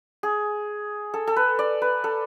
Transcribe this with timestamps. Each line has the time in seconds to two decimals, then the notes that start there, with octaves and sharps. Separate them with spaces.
0.23 G#4
1.14 A4
1.27 A4
1.36 B4
1.59 D5
1.82 B4
2.04 A4